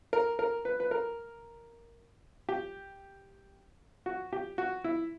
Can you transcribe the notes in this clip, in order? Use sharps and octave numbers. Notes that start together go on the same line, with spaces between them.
A#4
A#4
B4
B4
A#4
G4
F#4
G4
F#4
E4